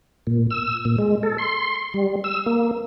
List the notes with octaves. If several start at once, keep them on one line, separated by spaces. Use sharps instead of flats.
A#2
E6
A#2
G#3
A4
C6
G3
E6
A#3